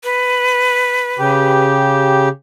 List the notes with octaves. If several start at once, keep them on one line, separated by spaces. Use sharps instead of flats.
B4
C#3 G4